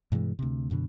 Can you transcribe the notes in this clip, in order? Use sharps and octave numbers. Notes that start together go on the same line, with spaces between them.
G2 B2 E3 G#3
D2 C3
F#2 B2 D3